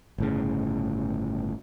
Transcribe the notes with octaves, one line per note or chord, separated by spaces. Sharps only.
G1 A2 C#3